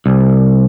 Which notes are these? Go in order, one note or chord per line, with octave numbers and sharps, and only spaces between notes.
C2